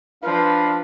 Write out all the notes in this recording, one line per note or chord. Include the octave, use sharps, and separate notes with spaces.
F3 D4 B4 F5